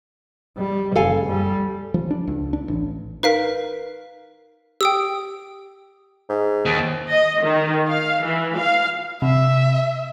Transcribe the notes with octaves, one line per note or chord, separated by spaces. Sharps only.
G3
F#1 A4 F5 G#5
G3
F3
D4
C#2
D4
A1
D#4 A#4 B4 F5 B6
G4 G5 D#6 E6
G#2
D#2
D#5
D#3
F5
E3
F5
C3 E5